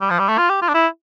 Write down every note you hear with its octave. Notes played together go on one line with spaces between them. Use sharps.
G3
F3
G3
A3
F4
G4
F4
D4
E4